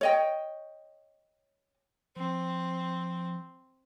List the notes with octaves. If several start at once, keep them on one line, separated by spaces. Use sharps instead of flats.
C#5 D#5 G5
F3 C4